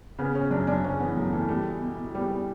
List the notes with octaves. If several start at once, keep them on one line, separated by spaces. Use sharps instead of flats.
C#3 B3
C#3 C#4
F#2 D4
F#2 D4
C#3 C#4
E3 B3
F#2 A3
E3 A3
G3 A3
B2
B2
B2
G3
G3